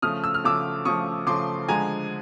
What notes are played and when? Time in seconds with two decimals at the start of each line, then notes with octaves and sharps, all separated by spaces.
0.02 C#3 F3 A3 D#6 F6
0.24 E6
0.34 F6
0.44 C#3 F3 A3 D6 E6
0.85 C#3 F3 A3 C#6 D#6
1.27 C#3 F3 A3 C6 D6
1.68 D3 F3 G#3 G#5 A#5